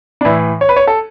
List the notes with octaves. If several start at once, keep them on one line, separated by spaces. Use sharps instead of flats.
D4
A2 E3 E4
C#5
B4
C#5
A4